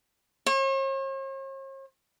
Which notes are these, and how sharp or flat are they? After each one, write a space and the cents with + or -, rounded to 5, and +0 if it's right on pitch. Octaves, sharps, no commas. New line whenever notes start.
C#5 -45